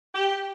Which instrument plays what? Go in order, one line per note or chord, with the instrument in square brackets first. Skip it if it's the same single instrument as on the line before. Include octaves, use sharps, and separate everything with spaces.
[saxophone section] G4